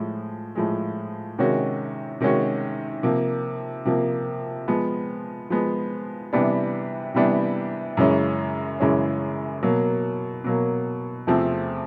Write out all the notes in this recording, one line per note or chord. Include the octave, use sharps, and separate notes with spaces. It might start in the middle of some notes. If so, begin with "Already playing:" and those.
Already playing: A2 F3 G#3
A2 F3 G#3
C3 D#3 G#3 C#4 F#4
C3 D#3 G#3 C#4 F#4
C3 F3 A#3
C3 F3 A#3
F3 G#3 B3
F3 G#3 B3
C3 E3 G3 B3 D4
C3 E3 G3 B3 D4
F#2 C#3 E3 G#3 C#4
F#2 C#3 E3 G#3 C#4
B2 F#3 A#3
B2 F#3 A#3
E2 C3 F3 A3 C4